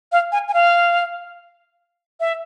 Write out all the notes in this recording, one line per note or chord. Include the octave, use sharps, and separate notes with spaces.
F5
G#5
G#5
F5
E5